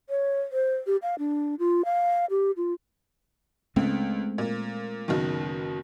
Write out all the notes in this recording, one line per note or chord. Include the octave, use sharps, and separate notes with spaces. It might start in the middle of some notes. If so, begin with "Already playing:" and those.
C#5
C5
G4
F5
D4
F4
F5
G4
F4
C#2 G#3 A3 C4
A#2
F#1 B2 D#3